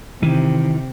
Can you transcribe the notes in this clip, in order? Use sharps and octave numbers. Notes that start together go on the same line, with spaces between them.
C3 D#3 E3